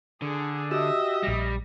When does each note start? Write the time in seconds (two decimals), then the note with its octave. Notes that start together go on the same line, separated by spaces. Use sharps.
0.22 D3 G#4
0.71 F#4 G4 D#5 E5 E6
1.23 A#1 G3 A#6